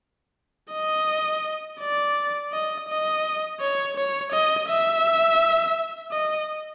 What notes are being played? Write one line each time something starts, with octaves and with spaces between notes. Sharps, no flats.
D#5
D5
D#5
D#5
C#5
C#5
D#5
E5
D#5